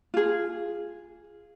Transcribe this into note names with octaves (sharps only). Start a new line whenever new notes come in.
F4 G#4